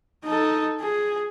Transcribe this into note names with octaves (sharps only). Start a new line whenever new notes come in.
D#4 A4
G#4